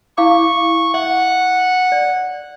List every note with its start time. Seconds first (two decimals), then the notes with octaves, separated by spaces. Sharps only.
0.18 E4 F5 C#6 D6
0.94 E5 F#5
1.92 D5